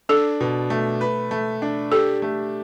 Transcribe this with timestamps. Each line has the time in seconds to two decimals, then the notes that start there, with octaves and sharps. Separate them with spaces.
0.09 D4 A4
0.40 B2
0.70 A3
1.01 B4
1.31 A3
1.62 D4
1.91 G4 A4
2.22 A3